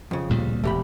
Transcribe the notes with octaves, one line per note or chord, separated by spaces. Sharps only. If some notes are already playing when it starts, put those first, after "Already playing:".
F2 C#3
D2 A#2 G3
E1 A3 G4 B5